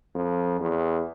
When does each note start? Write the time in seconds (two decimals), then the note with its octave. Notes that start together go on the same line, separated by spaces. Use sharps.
0.15 F2
0.60 E2